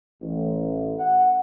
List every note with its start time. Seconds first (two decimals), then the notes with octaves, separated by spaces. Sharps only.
0.21 A1
0.98 F#5